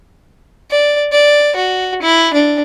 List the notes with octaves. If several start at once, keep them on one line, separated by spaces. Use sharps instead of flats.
D5
D5
F#4
E4
D4